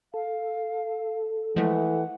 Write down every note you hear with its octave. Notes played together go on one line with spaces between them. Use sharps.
A4 F5
E3 F3 G#3 A3 F#5